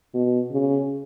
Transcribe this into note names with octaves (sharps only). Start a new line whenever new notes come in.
B2
C#3